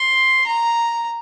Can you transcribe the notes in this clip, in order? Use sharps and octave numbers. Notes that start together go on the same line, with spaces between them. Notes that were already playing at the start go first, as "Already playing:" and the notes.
Already playing: C6
A#5